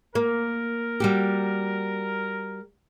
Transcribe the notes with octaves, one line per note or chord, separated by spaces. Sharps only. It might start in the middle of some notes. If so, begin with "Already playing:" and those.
A#3 A#4
G3 F#4 G4